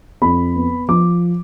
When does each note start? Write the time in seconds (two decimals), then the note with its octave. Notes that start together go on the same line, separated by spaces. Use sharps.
0.22 F2 B5
0.55 B3
0.88 F3 D6